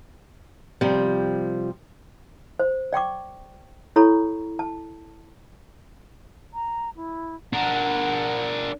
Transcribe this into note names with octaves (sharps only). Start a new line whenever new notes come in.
C3 F3 G3
C5
D5 G5 C#6 D6
E4 A4 C#5 A#5 B5 C#6
A5
A#5
E4
D4 A#4 F#5